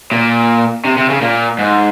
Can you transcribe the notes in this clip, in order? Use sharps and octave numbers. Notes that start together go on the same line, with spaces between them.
A#2
C3
C3
C#3
A#2
G#2